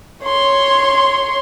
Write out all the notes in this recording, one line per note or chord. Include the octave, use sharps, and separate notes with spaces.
C#5 C6